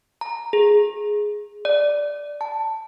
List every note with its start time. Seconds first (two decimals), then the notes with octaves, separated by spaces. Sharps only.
0.21 A#5
0.53 G#4
1.65 D5
2.41 A5